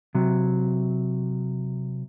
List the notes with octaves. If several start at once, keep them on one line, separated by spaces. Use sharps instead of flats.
C3 F#3